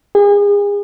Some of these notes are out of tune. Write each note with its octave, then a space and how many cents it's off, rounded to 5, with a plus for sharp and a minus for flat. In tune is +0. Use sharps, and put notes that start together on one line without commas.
G#4 -35